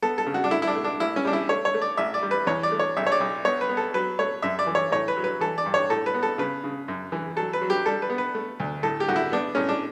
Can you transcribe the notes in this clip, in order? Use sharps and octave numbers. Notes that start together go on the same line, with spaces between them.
B3 A4
A4
C#3
F#4
D4
A3 E4
E4
D4
A3
D4
A1 E4
C#4
G3 D4
E4
A3 C#5
C#5
A3
D5
A1 E5
D5
G3
B4
E2 C#5
D5
A3
C#5
B1 E5
C#5
D5
B1
B3 C#5
B4
B3
A4
F#3 B4
A3 C#5
F#2 E5
D5
E3
C#5
A2 C#5
B4
F#3
B4
E3 A4
D5
G2
C#5
A2 A4
B4
B3
A4
C#3 B4
C#3
F#2
E3
F#3 A4
B4
F#3
G4
G3 A4
B4
B3
B4
A3
D2
A2 A4
G4
A2 F#4
E4
B3 D4
A2 C#4
D4